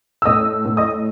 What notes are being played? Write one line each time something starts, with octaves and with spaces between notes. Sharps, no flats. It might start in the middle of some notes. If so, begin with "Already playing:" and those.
E6
A2 D#5 D#6
A2
D#5 D#6